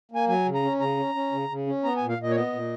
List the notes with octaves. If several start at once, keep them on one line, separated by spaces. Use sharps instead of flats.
A#3 G#5
F#3 G#5
C#3
A#5
C#4
C#3 A#5
C#4
C#4
C#3
C#3
C#4
B3 A#5
G#5
A#2
F5
A#2 D#5
C#5
B3 D#5
A#2